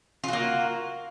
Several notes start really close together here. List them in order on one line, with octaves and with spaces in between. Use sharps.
F4 F#4 A#3